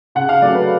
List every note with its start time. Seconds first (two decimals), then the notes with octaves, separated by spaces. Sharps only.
0.15 C#3 F#5
0.29 F5
0.42 F#3 A3 C#4 D5
0.55 B4